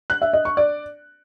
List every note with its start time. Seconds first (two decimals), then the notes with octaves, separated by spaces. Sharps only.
0.10 F#6
0.22 E5
0.33 D#5
0.45 C#6
0.57 D5